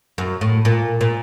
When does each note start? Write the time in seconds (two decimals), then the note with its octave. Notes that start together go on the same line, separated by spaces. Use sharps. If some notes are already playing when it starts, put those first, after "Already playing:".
0.18 F#2
0.41 A2
0.65 A#2
1.01 A#2